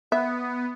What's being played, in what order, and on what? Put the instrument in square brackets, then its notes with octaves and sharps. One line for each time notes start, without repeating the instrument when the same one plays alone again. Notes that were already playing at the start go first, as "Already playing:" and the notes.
[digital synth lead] B3 [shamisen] E5